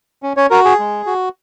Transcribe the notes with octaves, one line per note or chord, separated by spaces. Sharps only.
C#4
C#4 C#5
F#4 A#4
G#4
G#3
F#4